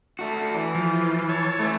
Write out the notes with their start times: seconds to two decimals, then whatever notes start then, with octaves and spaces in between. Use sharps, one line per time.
0.19 A3 F#4
0.55 E3
0.75 F3
1.29 C#5 A5
1.59 E3 A3